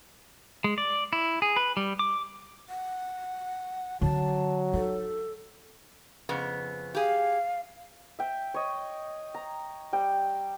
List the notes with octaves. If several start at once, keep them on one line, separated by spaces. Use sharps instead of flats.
G#3
D5
E4
G#4
B4
G3
D6
F#5
D3 F#3 C4 A5
D#4 A4
F2 C#3 B3
G4 G#4 F5
E5 G5
C#5 D#5
A#5
G3 G5